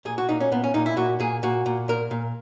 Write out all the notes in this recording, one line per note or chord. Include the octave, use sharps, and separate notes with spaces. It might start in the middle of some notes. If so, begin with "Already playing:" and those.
A#2 G#4
F#4
A#2 D#4
C#4
A#2 B3
C#4
A#2 D#4
E4
A#2 F#4
A#2 G#4
A#2 F#4
A#2
A#2 A#4
A#2